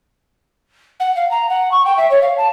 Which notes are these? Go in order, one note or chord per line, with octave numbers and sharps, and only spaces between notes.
F#5
F5
A#5
F#5
C#6
G5
E5
C#5
F5
A5